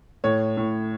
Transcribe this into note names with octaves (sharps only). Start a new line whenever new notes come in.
A2 C#5
A2